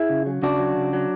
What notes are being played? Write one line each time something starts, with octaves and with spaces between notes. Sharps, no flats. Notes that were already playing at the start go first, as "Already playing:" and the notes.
Already playing: E4 G#4
C#3
F#3
C#3 D4 F#4
F#3
C#3
F#3